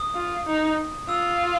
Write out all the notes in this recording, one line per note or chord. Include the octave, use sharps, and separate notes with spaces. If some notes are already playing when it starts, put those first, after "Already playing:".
Already playing: D#6
F4
D#4
F4 E6